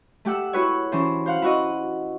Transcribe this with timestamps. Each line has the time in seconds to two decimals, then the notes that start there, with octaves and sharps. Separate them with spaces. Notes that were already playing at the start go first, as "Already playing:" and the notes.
0.25 A3 G4 F#5 E6
0.53 E4 F#4 B4 C#5
0.92 E3 C#4 D4 C5
1.26 C5 F5 F#5
1.42 E4 F#4 D#5